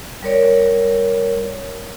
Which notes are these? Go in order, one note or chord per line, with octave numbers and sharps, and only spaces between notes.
G3 A#4 C#5 D5